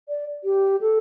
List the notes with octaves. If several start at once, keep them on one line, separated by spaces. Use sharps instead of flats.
D5
G4
A4